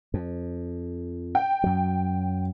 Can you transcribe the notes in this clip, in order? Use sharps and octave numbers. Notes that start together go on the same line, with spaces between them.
F2
G5
F#2 F#3